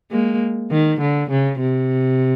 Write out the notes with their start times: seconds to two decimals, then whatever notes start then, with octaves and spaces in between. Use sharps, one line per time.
0.11 G#3 A#3
0.71 D#3
1.01 D3
1.30 C#3
1.60 C3